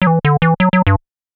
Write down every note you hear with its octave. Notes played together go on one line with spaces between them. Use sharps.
F#3
E3
D3
E3
F#3
F#3
G2